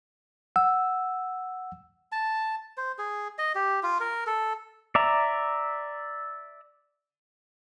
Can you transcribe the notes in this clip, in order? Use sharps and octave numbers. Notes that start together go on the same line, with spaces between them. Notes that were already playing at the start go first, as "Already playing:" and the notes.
F#5 E6
A5
C5
G#4
D#5
G4
F4
A#4
A4
D5 E5 A#5